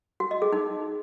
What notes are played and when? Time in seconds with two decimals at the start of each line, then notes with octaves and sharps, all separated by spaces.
0.20 F#4
0.31 D#5
0.42 G#4
0.53 D#4